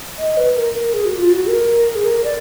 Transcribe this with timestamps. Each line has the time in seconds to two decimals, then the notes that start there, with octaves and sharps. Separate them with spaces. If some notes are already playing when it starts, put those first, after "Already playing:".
0.18 D#5
0.37 B4
0.56 A#4
0.74 A#4
0.94 G#4
1.05 F#4
1.18 F4
1.31 F#4
1.49 A#4
1.96 G#4
2.05 A#4
2.24 D5